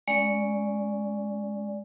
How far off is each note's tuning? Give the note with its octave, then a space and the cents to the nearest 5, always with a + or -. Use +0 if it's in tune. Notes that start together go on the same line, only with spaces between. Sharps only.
G#3 +0 C#4 +0 D5 -5